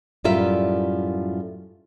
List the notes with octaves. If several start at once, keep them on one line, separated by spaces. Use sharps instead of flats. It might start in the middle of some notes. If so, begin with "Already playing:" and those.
F#2 A2 G3 F4 A#4 E5